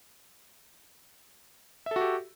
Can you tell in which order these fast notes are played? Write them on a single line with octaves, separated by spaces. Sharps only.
E5 A4 F#4 G4